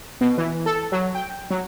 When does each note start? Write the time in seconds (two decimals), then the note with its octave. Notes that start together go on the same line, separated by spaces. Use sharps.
0.21 B2
0.38 E3
0.66 A4
0.92 F#3
1.15 G5
1.50 F#3